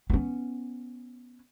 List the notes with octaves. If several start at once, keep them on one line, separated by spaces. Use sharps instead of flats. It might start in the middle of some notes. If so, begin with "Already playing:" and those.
B3 C#4